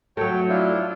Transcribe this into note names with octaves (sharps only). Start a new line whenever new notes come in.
F#3 A3 C#5 G5
D4 E4 F4